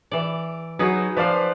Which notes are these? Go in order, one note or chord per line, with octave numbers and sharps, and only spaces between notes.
E3 D5
F#3 D#4 F#4 G#4 B4
F3 B4 C5 D5 F5